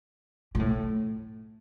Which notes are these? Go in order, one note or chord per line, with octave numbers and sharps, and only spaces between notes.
A#2
A2